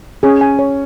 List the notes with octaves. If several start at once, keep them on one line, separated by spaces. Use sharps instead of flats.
C#4 G#4
G#5
C#5